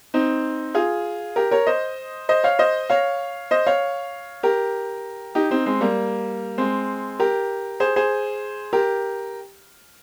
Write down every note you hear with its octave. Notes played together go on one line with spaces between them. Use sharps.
C4 D#4
F4 G#4
G4 A#4
A#4 C#5
C5 D#5
C5 D#5
C#5 F5
C5 D#5
C#5 F5
C5 D#5
C#5 F5
G4 A#4
D#4 G4
C4 D#4
G#3 C4
G3 A#3
G#3 C4
G4 A#4
G#4 C5
G#4 C5
G4 A#4